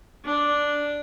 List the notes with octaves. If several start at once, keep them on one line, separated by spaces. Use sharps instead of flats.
D4